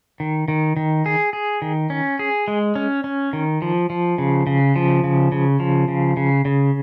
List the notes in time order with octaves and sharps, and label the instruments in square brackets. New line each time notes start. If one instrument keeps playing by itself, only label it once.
[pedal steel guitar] D#3
D#3
D#3
G#4
G#4
D#3
C#4
G#4
G#3
C#4
C#4
D#3
F3
F3
C#3
C#3
F3
C#3
C#3
F3
C#3
C#3
C#3